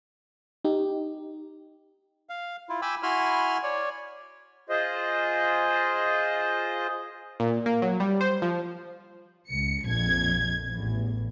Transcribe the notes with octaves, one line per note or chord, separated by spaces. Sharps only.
D#4 G4
F5
E4 F4
G5 G#5 B5 D6 E6
E4 F#4 G#5 B5 C6 F6
C#5 D5
F4 G#4 C5 D#5
A#2
A#3
F#3
G3
C5
F3
C#2 C#7
A#1 F2 G#6
A1 E2